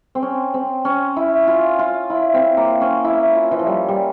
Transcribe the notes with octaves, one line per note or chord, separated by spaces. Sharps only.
C4
C#4
C4
C#4
E4
F4
F4
E4
C4
A#3
C#4
E4
F4
E3
F3
G3
G3